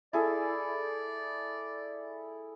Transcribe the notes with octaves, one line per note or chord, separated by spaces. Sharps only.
E4 G#4 A4 D5